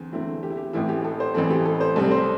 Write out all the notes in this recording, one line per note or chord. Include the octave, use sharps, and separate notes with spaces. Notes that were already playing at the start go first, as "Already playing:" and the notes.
Already playing: E2 D3 C4
E2 D3 C4 E4
G4
E4
G4
A1 A2 E3 C4 E4
G4
A4
C5
A1 A2 E3 C4 A4
G4
A4
C5
C2 C3 G3 C4 A4
C5